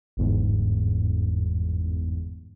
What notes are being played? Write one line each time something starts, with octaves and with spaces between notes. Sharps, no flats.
G1 E2 G#2